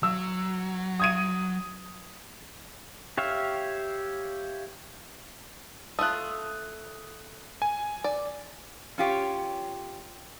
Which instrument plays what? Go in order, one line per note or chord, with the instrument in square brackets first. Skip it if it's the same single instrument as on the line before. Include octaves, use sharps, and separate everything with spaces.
[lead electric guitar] F#3 [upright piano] E6
[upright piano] D#6 G#6 D#7
[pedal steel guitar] G4 C#5 E5 F5
[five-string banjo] A3 F4 [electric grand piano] D#6 F#6
[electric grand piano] G#5
[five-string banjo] D5
[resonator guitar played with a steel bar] C#4 F4 G4 C#5